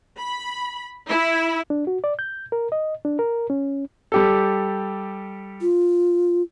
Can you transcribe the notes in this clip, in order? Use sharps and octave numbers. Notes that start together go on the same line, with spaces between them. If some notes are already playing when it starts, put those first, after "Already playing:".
B5
E4
D4
F#4
D5
G6
A#4
D#5
D4
A#4
C#4
G3 G4 A4
F4